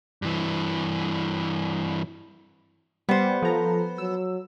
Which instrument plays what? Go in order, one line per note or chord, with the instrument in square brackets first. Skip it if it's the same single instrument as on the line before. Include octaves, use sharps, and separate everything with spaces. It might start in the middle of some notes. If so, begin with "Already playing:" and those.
[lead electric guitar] G2 E3
[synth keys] G3 [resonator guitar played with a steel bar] B3 C5
[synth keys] F3 A#5 [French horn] A4
[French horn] F#3 [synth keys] E6